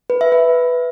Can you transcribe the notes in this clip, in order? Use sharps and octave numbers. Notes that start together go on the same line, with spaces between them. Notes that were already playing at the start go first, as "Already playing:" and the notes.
B4
E5
B4